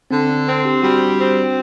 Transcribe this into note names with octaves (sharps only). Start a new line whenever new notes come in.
D3 C4
D4
C4
G4
G3 F#4
C4